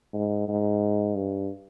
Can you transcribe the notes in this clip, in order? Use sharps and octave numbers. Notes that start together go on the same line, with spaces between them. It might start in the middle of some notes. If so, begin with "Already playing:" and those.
G#2
G#2
G2